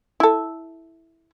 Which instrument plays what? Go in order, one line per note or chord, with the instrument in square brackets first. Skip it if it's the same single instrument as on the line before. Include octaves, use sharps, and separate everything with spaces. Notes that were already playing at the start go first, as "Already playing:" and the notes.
[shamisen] E4 A4